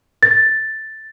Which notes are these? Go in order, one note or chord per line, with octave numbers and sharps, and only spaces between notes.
A6